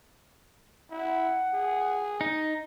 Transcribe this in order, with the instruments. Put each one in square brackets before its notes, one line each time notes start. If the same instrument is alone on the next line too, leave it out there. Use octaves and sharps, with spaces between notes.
[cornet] E4 [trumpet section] F#5
[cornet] G#4
[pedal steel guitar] D#4